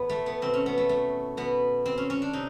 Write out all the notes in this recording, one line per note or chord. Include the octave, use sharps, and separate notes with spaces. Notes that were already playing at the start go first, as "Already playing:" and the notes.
Already playing: A2 E3 B3
A3
B3
B2 C4
C#4
B3
A3
A3
B2 B3
C4
C#4
C#4
D4
C3 D#4